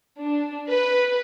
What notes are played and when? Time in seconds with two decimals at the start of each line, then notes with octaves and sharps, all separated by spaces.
0.23 D4
0.70 B4